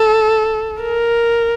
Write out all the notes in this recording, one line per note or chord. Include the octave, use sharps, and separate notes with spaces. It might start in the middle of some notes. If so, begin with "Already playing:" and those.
Already playing: A4
A#4